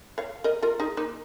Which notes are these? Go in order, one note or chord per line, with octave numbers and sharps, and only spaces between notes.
C#5 F5
A#4 D#5
F4 A#4
D#4 G#4
A#3 D#4